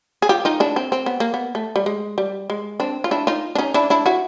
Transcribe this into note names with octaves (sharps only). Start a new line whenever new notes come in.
G#4
F4 G4
D#4 F4
D4 E4
C4
C4
B3
A#3
B3
A3
G3
G#3
G3
G#3
C4 D4
F4
D4 E4
D#4 F4
D4
C#4 D#4
D4 E4
D4 E4
E4 F#4